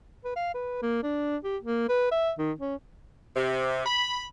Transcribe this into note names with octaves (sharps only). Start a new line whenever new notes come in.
B4
F5
B4
A#3
D4
G4
A#3
B4
E5
D#3
C#4
C3
B5